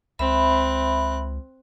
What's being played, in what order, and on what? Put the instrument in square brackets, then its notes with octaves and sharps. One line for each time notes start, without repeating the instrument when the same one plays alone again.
[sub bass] C#2 [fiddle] C4 F#6 [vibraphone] E5 B5